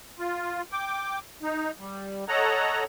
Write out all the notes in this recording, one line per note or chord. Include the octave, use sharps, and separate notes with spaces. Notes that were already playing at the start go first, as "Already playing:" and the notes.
F4
G5 D6
D#4
G3
A4 C#5 D#5 F#5 A#5